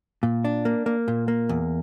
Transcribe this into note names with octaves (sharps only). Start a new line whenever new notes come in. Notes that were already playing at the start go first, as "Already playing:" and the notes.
A#2
D4
A#3
A#3
A#2
A#3
E2